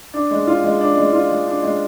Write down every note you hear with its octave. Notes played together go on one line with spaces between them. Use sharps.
D4
G#3
F4
G#3
D4
G#3
F4
G#3
D4
G#3